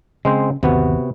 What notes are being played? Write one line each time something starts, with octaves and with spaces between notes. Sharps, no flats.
C#3 G#3 C4 C5
G1 D#2 C3 B3 F#4